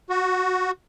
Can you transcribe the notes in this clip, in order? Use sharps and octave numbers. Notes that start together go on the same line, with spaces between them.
F#4